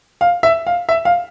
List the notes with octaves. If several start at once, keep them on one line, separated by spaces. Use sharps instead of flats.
F5
E5
F5
E5
F5